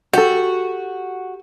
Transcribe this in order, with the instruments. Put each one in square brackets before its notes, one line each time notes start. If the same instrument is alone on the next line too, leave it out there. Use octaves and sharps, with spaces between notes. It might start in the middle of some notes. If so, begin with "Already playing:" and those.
[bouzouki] F#4 [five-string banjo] G4 A4